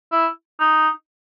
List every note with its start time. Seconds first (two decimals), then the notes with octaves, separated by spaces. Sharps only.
0.12 E4
0.60 D#4